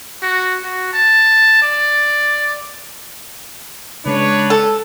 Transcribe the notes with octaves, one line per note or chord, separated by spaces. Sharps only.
F#4
F#4
A5
D5
C#3 G#3 C#4 D4 B4 C#5
A4